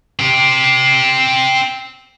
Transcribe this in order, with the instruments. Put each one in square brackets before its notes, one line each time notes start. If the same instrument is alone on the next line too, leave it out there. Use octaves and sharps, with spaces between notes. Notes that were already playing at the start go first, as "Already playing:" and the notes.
[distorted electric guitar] C4 G4